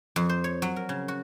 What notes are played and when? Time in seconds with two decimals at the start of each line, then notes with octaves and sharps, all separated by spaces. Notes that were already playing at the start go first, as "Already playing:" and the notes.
0.16 F2
0.29 C5
0.44 C#5
0.62 F#3
0.76 A#4
0.89 C#3
1.08 F#4